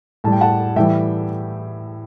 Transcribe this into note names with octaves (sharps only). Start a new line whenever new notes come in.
A2 G3 A5
G5
F#5 A5
A2 E3 G3 E5 G5